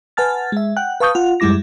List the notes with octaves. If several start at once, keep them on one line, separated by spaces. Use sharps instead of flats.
B4 F#5 G#5 A5 F6 A6
G#3 E5
F#5 G5 F#6
B4 F5 A5 C#6 D#6 G6
F4 F#5
F#2 G3 G#3 E4 D6 A#6